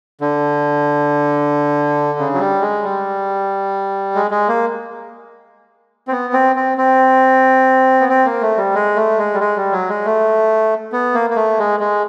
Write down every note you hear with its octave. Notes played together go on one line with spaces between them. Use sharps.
D3
C#3
F#3
G3
G#3
G3
G#3
G#3
A#3
C4
B3
C4
C4
C4
B3
C4
A#3
A3
G3
G#3
A3
G#3
G3
G#3
G3
F#3
G#3
A3
B3
A#3
A#3
A3
G#3
G#3